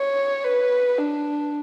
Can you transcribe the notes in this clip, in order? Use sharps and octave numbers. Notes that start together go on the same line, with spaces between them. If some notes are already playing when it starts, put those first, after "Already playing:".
Already playing: C#5
B4
D4